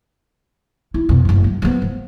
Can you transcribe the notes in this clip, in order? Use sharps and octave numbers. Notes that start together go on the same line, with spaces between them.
E4
F2 B2
F#1 A2
F#2
F3 B3
F3